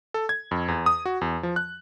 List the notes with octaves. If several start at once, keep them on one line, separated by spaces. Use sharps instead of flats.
A4
G#6
F2
E2
D#6
F#4
E2
F3
F#6